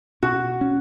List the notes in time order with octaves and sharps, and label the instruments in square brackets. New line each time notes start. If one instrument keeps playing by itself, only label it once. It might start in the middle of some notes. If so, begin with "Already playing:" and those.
[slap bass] B2 [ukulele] F#4
[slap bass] C#4